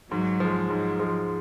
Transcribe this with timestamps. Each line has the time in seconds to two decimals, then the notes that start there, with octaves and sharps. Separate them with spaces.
0.11 G#2 F#3
0.40 F3 G#3
0.70 G#2 F#3
0.99 F3 G#3